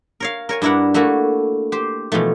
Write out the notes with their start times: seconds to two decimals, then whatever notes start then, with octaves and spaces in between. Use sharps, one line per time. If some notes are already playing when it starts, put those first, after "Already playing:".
0.20 A#4 C#5 F5
0.49 A#4 C#5 G#5
0.62 G2 D4 E4 A#4 F#5
0.94 A3 A#3 E4 F#4 A4
1.72 G4 C5
2.12 B2 E3 F3 A3